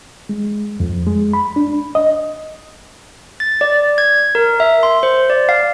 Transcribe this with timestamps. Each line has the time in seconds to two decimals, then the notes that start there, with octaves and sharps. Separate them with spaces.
0.29 G#3
0.80 F2
1.07 G#3
1.33 B5
1.56 D4
1.95 D#5
3.40 A6
3.61 D5
3.98 G#6
4.35 A#4
4.60 E5
4.83 C6
5.03 C5
5.30 D5
5.49 F5